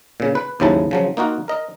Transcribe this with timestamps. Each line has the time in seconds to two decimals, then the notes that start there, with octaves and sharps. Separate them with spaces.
0.20 A#2 C#3
0.35 B4
0.60 D#2 G#2 C#3 F#3 E4 A5
0.91 C#3 F3 F#3
1.17 A#3 D#4 F4 F#4
1.48 A#4 D#5